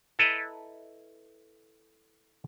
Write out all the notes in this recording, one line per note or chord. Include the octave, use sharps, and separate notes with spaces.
E4 A4 B4 D#5 A#5